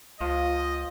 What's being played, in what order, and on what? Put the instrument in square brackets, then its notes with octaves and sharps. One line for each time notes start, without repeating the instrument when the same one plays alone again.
[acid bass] C#2 [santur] F3 [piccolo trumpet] D#5